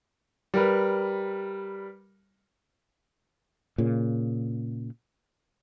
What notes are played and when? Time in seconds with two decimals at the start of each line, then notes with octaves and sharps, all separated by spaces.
0.54 G3 A#4 B4
3.78 A#2 C#3